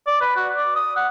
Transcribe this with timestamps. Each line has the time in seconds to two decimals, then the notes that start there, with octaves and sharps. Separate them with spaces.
0.07 D5
0.21 B4
0.36 F#4
0.56 D5
0.76 D#6
0.96 F#5